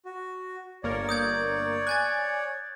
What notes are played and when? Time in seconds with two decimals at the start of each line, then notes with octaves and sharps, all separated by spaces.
0.05 F#4
0.83 G1 A#3 A#4 C#5 D5
1.09 D#6 G6 G#6
1.87 G#5 F#6 G#6 A6